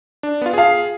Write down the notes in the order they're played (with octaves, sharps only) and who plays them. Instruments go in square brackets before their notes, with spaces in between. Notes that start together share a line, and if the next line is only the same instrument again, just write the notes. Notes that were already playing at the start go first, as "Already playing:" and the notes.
[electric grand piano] D4
B3 F4
[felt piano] F4 F5 [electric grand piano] G#4